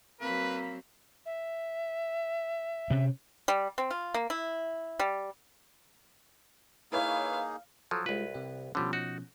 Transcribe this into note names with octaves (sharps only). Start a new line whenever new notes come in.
F#3 A#3 C4 B4 B5
E5
C3 C4 C#4
G3
C4
F4
A#3
E4
G3
A#3 D#4 E4 G#4 B4 C#5 F5
F3 F#3 A4
C2 G#3 F4 B4
C3 G4
B2 D3 F3 G3 C#4
D#4 F#4